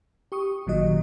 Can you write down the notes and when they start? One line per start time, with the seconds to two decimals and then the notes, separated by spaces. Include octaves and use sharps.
0.32 G4 C#6 D#6
0.66 G#1 A#2 D#3 F#3 D#5